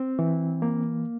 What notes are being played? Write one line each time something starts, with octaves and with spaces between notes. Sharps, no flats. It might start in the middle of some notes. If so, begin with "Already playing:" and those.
Already playing: C4
E3
A#3